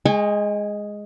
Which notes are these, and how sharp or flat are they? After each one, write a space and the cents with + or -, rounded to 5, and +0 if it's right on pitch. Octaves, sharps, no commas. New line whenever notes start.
G#3 +0 G#5 -45 C#6 -5